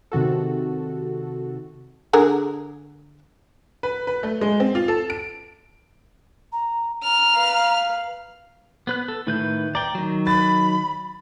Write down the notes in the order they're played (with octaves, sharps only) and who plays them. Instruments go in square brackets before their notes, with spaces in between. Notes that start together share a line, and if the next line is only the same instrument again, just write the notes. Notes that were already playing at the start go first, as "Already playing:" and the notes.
[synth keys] C3 D#3 F#4 A4
[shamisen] D3 G#4 A#4
[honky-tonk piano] B4
B4
A3
G#3
C4
F4
A4
D7
[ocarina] A#5
[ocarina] A#5 [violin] F6
[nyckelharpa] B4 F5
[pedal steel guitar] B3 B4 F#6
A4
[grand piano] A2 [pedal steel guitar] D#3 B4 G6
[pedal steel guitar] D5 G5 [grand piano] A#5
[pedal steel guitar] D#3 F#3
[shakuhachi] B5 [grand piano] A6